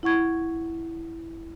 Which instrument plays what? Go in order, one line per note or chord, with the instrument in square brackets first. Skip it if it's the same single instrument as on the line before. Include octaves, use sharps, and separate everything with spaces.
[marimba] E4 F#5 C#6 G#6